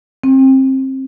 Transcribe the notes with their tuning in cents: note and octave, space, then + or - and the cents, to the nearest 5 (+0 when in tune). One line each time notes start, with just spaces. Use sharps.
C4 +25